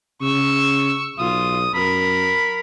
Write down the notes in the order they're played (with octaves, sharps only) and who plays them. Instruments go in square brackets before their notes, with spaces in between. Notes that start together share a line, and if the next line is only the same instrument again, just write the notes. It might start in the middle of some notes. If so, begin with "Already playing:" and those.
[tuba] C#3 [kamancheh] C#6 E6
[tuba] B1 [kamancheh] F4 [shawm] D#6
[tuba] F#2 [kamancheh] A#4 [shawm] B5